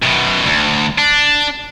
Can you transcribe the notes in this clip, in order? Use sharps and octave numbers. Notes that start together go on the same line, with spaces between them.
F#2 B2
D2
D4